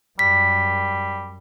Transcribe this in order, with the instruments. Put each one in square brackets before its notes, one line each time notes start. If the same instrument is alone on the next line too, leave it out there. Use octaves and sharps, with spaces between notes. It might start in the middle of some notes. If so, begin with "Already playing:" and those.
[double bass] F#2 [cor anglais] G3 [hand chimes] B6